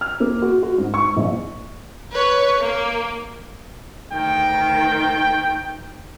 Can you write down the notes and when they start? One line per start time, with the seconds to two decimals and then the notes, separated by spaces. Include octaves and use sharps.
0.01 F6
0.20 A#3
0.42 F#4
0.63 F#4
0.78 G#2
0.94 C#6
1.16 A#1
2.12 B4 C#5
2.61 A#3
4.13 D2 D#3 G5